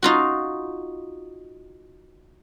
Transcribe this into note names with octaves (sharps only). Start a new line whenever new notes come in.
D#4 F4 F#4